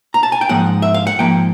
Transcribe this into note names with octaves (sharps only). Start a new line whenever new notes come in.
A#5
A5
G#5
G5
G#2 F3 A#3 F#5
E5
F5
F#5
G#2 F3 A#3 G5